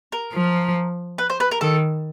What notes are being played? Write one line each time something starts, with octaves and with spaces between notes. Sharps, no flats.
A#4
F3
B4
C5
B4
A#4
D#3 A4